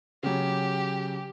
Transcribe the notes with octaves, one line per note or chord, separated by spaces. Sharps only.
C#3 F#3 G4